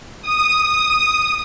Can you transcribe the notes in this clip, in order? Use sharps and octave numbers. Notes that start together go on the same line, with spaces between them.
D#6